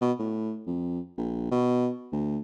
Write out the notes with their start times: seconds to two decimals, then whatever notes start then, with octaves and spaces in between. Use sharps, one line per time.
0.01 B2
0.19 A2
0.67 F2
1.17 A#1
1.51 B2
2.12 D2